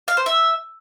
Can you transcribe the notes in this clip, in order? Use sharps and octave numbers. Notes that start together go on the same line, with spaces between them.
F5
C5
E5